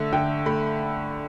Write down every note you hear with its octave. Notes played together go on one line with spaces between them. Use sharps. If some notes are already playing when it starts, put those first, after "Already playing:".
Already playing: D3 A3 E5
D3 G5
A3 B5